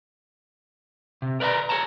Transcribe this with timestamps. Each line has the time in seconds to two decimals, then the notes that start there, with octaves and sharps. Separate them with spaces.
1.22 C3
1.40 A#4 B4 D5 F#5 A#5
1.69 G#4 C5 C#5 A5 A#5